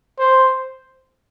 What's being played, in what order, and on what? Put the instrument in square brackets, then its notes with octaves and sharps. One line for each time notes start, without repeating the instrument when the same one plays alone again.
[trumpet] C5